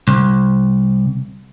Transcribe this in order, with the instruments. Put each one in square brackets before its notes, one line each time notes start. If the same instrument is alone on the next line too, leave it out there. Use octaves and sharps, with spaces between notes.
[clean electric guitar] C2